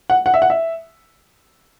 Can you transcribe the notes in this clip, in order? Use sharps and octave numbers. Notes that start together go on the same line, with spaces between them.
F#5
F#5
E5
F#5
E5